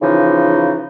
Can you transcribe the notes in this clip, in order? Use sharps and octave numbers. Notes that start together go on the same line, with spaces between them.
C#3 E3 F3 D#4